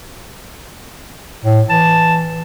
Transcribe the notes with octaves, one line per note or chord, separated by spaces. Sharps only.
A2
E3 A5